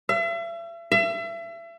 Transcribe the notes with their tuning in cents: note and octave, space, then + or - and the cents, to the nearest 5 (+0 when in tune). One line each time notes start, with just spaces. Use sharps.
E5 +40
E5 +35